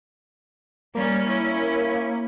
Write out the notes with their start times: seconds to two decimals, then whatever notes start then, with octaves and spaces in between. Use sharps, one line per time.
0.95 G3 A#3 C#4
1.27 C#4 E4